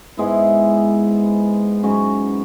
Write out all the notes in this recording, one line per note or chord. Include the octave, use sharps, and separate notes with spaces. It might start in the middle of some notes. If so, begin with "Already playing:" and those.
G#2 G#3 B3 E4
G#2 F#3 C#4 F#4